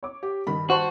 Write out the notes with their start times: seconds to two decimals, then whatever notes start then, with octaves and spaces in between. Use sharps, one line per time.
0.03 C#5 D6
0.23 G4
0.47 G2 D#3 B5
0.70 F#4 C5 A5 C6